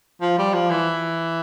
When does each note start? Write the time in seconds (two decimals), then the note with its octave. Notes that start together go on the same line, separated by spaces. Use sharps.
0.21 F3
0.38 G3
0.53 F3
0.70 E3